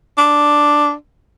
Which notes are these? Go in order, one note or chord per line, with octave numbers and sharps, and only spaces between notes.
D4